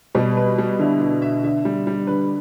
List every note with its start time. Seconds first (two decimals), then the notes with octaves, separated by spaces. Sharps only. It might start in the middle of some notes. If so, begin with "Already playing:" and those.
0.15 B2 G3
0.37 B4
0.58 G3
0.79 D3 E4
1.01 E4
1.22 E5
1.44 D3 E5
1.65 G3
1.87 G3
2.07 D3 B4